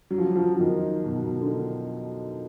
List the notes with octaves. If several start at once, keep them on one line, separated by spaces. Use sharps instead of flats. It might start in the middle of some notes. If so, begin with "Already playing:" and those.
F#3
F3
F#3
F3
F3
D#3
B2
B2
D3